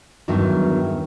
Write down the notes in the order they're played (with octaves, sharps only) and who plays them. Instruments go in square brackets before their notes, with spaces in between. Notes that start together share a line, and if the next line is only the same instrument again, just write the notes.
[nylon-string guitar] E2 G2 D#3 F#3 E5